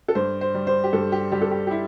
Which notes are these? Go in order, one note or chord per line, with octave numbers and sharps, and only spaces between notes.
A4
G2 C5
C5
G3
C5
G4
G2 A4
G4
G3 G4
A4
G4
G4
E4